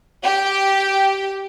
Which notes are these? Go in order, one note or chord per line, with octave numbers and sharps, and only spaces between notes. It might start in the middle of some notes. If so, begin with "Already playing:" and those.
G4